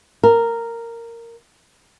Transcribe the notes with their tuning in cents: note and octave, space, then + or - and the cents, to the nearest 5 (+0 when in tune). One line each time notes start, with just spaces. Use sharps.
A#4 -10